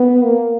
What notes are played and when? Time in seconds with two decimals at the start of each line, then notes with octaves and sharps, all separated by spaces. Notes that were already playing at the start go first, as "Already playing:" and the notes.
Already playing: B3
0.24 A#3